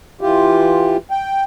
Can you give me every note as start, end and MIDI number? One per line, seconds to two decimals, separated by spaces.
0.21 0.97 52
0.21 0.97 65
0.21 0.97 67
1.11 1.44 79